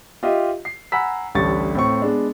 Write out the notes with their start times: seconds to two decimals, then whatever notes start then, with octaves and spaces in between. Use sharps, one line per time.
0.23 F4 G4 D#5 E5
0.65 C7
0.92 F#5 G#5 A#5 B5 E6 B6
1.35 A1 D2 D3 G3 C#6 A6
1.75 A2 C4 C#6
2.02 G#3 B3 D4